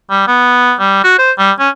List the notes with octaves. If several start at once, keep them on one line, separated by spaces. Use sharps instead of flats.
G3
B3
G3
F#4
C5
G3
C#4